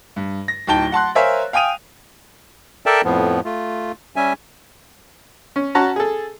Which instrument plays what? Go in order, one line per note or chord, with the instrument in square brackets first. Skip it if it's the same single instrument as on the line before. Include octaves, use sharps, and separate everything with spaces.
[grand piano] G2
A#6
D1 D#4 G5 A5 G7
F#5 A5 C6 F#6
A#4 C5 C#5 E5 F5 G#5
F5 G5 G#5 D#6 D#7 F7
[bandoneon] A4 A#4 D5 E5 G5 A5
F2 A2 F3 B3
A3 F4
G3 C#4 E5 G#5
[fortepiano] C#4
C#4 F#4 A5 A#5
G#4 A4